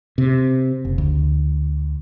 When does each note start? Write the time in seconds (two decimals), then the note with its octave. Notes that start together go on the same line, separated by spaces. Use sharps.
0.18 C3
0.85 F#1
0.98 D2